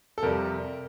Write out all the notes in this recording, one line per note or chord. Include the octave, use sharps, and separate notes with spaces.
A4
F2 C3 G3 A#4